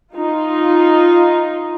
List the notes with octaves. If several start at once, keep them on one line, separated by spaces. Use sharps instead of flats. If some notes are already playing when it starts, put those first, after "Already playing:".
D#4 F4